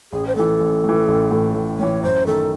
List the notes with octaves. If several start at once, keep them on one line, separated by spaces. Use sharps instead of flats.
A1 G#4
C5
A2 E3 A4
A1
A2 E3
A1
A2 E3
A1
A2 E3 C#5
F#2 C5
D#3 A3 A4